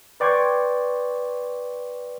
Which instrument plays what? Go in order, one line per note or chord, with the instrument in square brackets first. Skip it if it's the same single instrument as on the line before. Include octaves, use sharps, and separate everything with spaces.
[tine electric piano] B4 D5 G5 C6 C#6 G#6